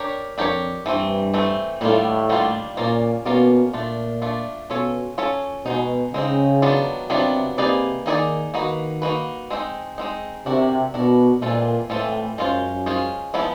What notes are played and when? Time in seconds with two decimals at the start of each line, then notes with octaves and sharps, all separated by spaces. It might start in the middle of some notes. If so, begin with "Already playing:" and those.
Already playing: D4 G4 A#4 C#5
0.38 F2 D4 G4 A#4 C#5
0.86 G2 E3 A3 C4
1.34 E3 A3 C4
1.81 A2 D#3 G3 A#3 D4 F4
2.29 D#3 G3 A#3 D4 F4
2.77 A#2 A#3 C#4 F4 A#4 D5
3.25 B2 A#3 C#4 F4 A#4 D5
3.73 A#2 A3 D4 F4
4.22 A3 D4 F4
4.70 B2 C#4 F4 A4 C#5
5.18 C#4 F4 A4 C#5
5.66 B2 G#3 C4 D#4
6.13 C#3 G#3 C4 D#4
6.62 D#3 F#3 B3 D4 F4
7.09 C3 D#3 F#3 B3 D4 F4
7.58 C3 A#3 D#4 G#4 B4 D5
8.06 D#3 A#3 D#4 G#4 B4 D5
8.54 D#3 A#3 D#4 F#4 B4
9.02 A#3 D#4 F#4 B4
9.50 G#3 C4 D#4
9.98 G#3 C4 D#4
10.46 C3 D4 F#4 A#4
10.94 B2 D4 F#4 A#4
11.42 A#2 E3 G#3 C4 F4 A4
11.90 A2 E3 G#3 C4 F4 A4
12.38 F#2 G#3 C#4 F4 G#4 C5
12.86 G#3 C#4 F4 G#4 C5
13.34 F3 G#3 B3 E4